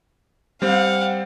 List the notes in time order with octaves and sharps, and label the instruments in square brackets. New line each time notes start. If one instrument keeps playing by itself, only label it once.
[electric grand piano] G3 C4 [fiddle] F5 F#5